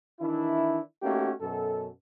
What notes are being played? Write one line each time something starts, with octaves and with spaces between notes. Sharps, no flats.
D#3 E3 D4 E4
A3 A#3 C#4 D#4 F#4 G4
F#2 B2 A4